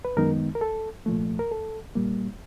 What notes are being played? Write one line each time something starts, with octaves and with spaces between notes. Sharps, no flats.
B4
F#2 D#3 G#3 B3 D#4 A#4
A#4
A4
C2 A#2 F3 A3
A#4
A4
A#2 G3 A#3